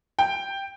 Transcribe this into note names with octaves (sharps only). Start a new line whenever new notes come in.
G5